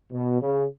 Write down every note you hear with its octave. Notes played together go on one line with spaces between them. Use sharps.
B2
C#3